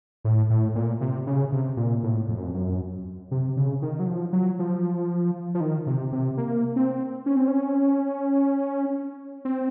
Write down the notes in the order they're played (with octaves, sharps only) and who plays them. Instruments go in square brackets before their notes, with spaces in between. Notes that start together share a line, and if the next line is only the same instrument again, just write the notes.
[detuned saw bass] A2
A2
A#2
C3
C#3
C3
A#2
A2
F2
F#2
F2
F#2
C3
C#3
D#3
F#3
F3
F#3
F3
F3
D#3
C3
C3
A#3
C4
C#4
C4
C#4
C4